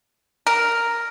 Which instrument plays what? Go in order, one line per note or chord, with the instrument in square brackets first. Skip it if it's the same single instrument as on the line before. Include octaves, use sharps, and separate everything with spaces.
[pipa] A#4